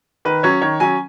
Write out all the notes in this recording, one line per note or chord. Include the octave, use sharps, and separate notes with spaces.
D#3 B4
F#3 C#4 C#5
D#3 C#5
F#3 C#4 G#5